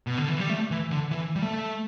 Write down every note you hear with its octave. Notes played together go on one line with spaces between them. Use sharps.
B2
D3
E3
G3
A3
E3
D3
E3
G3
A3